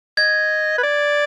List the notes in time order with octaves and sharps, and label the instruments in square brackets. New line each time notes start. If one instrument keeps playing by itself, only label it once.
[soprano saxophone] D#5 [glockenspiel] G#6
[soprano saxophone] B4
D5